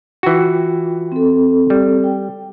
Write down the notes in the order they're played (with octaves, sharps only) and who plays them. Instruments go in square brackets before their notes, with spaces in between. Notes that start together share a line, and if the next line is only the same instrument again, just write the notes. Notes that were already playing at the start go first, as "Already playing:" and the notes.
[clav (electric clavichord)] E3 F#4 [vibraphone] F4 G5
[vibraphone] C4 A4
[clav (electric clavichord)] G3
[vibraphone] G5